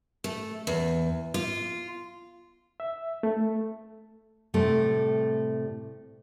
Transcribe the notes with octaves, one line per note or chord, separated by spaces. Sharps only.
A3
E2
F4
E5
A3
A2 C3 G3 A3